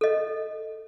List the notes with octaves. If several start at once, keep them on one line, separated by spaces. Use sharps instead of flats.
A4 D#5